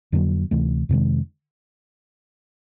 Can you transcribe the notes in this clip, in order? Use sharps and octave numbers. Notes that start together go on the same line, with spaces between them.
F2 D3 F#3 A#3
D2 C3 E3 A3
F2 C3 D#3 G#3